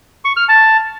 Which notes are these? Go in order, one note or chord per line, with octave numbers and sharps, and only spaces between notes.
C#6
F6
A5